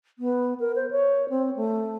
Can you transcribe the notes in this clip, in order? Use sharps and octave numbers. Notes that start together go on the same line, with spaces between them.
B3
A#4
C5
C#5
C4
A3